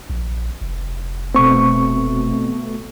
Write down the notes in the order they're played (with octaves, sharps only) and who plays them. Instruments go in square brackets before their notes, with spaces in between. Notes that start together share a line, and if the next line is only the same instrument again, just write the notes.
[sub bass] A#1
F1
[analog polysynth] B2 A3 [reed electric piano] C4 C#6